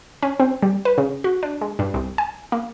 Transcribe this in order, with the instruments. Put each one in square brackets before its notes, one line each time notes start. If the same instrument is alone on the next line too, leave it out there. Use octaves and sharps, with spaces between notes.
[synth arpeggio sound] C#4
C4
G3
B4
C#3
F#4
D4
G#3
G2
C2
G#5
A#3